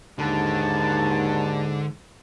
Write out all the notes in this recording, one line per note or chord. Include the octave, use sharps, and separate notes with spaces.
D#2 G#2 D3 A5